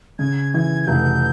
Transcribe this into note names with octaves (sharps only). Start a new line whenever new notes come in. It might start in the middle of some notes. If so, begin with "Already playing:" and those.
C#3 G#6
E3 G#6
G#6
F1 G6